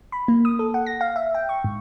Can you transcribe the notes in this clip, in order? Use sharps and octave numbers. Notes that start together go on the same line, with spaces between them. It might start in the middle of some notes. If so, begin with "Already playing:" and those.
B5
A#3
D#6
A4
F#5
A#6
F5
E5
G5
C#6
G#2